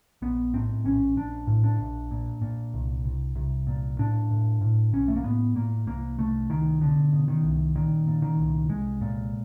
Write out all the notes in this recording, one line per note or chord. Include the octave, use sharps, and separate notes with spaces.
A#1 B3
A2 C4
A#1 C#4
A#1 D4
A2
D4
A#1
A#2
A#2
C2
C2
C2
A#2
A2 D4
A2
A2
B1 C#4
A3
A#3
A2 B3
A2 A#3
C2 A#3
C2 A3
C2 D#3
B2 D3
B2
D#3
C2
A#2 D#3
A#2
D#3
C2
C2 G#3
A#2